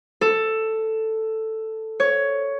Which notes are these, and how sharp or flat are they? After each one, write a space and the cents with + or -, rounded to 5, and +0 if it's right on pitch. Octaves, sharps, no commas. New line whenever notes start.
A4 +5
C#5 +10